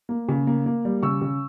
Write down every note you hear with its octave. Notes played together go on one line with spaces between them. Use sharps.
A#3
C#3
A#3
A#3
G3
C#3 C#6 E6
C#3